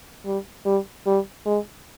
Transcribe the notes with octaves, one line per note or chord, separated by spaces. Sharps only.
G3
G3
G3
G#3